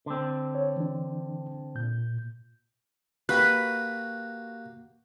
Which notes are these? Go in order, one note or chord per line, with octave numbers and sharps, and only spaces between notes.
D3 C4
C#5
E3 D4
A#2 G6
A#3 F#4 G4 B4 F#6